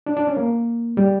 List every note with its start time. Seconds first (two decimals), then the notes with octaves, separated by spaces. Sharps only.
0.06 D4
0.17 D4
0.27 C#4
0.37 A#3
0.97 G3